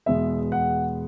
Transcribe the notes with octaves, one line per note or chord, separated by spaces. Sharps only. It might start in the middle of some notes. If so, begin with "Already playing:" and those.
E2 B2 G#3 B3 E5
F#5